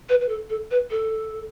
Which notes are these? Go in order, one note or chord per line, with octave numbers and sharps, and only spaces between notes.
B4
B4
A4
A4
B4
A4